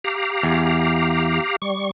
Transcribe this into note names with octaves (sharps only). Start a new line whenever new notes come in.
G4 F5 A#5
E2
G3 C#6